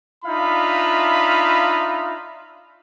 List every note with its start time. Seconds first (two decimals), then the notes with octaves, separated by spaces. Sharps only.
0.25 D4 D#4 F4 E5 F5 B5